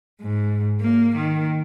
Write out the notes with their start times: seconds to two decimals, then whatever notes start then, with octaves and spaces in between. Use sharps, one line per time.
0.22 G#2
0.81 A#3
1.16 D#3